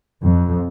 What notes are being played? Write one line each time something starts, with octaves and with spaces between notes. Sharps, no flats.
F2